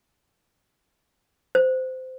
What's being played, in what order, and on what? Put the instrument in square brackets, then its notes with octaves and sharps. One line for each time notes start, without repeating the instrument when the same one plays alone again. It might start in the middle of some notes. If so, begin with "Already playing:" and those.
[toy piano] C5